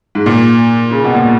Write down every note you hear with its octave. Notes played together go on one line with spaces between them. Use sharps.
G#2
A#2
C#3
B2
A#2